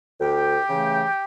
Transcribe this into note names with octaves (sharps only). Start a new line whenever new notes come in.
D2 G4 G5
C#3 E3 A3